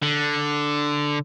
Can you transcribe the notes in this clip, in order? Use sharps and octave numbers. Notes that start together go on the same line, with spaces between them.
D3